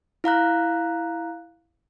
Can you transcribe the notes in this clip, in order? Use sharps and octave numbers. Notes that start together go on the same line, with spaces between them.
E4 F5 A#5 F#6